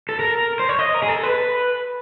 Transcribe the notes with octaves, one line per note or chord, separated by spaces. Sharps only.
A4
A#4
C5
C#5
D#5
A#4
G#4
A4
B4